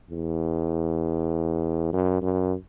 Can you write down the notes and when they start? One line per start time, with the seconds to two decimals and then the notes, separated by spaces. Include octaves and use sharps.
0.10 E2
1.93 F#2
2.22 F#2